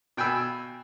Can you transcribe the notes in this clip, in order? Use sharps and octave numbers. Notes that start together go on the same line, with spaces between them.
B2 G5 G#5 B5 E6